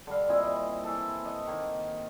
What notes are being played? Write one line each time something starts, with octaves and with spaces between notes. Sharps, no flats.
D3 G3 F5
A#2 C4 E4 D#5
E3 A4
D#5 F#5
D#3 A#3